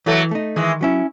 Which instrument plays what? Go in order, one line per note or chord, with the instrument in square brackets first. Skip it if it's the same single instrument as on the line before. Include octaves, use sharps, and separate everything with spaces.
[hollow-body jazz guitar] E3 [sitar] F#3 A3
[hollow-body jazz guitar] A3 D#4
[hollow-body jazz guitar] D#3 [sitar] E3 G#3
[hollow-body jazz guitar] F#3 C#4 E4